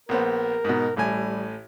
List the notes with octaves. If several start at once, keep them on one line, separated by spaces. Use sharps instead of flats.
A#1 B3 A#4 C5
G#2 B2
A1 A2 G3 G#5